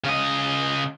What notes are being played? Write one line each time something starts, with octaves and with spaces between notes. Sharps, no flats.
C#3 D#5